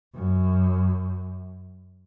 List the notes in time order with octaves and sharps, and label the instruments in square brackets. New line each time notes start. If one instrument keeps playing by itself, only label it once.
[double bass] F#2